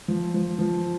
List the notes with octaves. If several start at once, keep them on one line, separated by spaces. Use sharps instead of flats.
F3
F3
F3